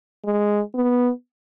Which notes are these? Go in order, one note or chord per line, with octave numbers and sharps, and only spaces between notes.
G#3
B3